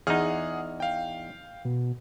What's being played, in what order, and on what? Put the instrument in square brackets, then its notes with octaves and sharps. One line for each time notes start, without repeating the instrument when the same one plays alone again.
[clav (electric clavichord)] E2 D#4 [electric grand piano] G#4 F#5 F6
[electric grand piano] F5 G5
[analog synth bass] B2